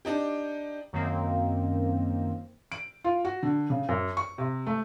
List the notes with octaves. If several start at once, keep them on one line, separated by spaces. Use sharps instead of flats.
D4 D#4 G4
F#2 D#3 A#3 C4
D7
F4
F#4
D3
C#3
F#2
C#6
C3
A3